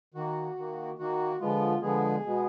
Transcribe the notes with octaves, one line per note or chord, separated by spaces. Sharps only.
D#3 A#3 F#4
D#3 A#3
D#3 A#3 F#4
D3 F3 G#3 B3 F4
D3 F3 G#3 B3 G#4
B2 G#3 B3